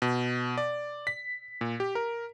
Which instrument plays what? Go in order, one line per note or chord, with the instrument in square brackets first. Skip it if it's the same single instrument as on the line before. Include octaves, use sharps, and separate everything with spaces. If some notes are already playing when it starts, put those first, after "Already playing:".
[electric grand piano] B2
D5
B6
A#2
G4
A#4